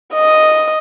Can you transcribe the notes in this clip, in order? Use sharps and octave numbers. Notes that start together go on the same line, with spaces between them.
D#5 D#6